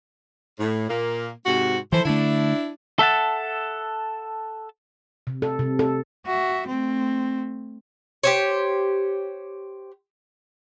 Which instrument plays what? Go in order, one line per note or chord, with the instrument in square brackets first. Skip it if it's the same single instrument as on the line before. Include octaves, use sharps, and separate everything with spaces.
[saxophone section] A2
A#2 A#3
G#2 C3 F#4
[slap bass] E3 F3 [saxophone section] E4 A4 C5
[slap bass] D3 A3 [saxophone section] D4 E4
[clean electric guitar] A4 E5 F#5 A5
[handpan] C3
A4
C3
A4
[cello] F#4 E5
A3 C4
[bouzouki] G4 C5 C#5